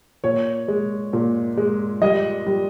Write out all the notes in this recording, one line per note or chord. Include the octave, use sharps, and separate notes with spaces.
A#2 C#5
G#3
A#2
G#3
G3 D#5
G3